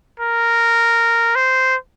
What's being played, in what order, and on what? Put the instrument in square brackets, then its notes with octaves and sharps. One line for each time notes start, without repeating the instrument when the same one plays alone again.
[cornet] A#4
C5